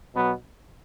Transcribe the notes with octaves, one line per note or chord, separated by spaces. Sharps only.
B2 F#3 B3